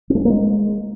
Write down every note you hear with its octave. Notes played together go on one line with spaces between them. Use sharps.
C4
A3
C#4
A#3
G#3